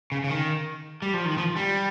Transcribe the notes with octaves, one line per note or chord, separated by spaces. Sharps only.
C#3
C#3
D#3
G3
F3
D#3
F3
G3